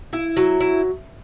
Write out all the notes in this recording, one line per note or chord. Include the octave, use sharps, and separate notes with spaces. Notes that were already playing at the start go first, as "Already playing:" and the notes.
E4
F#3
E4